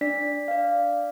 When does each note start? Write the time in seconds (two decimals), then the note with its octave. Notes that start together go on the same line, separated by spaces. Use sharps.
0.01 D4 D5 B6
0.48 D5 F5